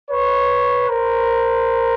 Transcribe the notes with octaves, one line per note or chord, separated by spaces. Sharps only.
B4 C#5
A#4 C5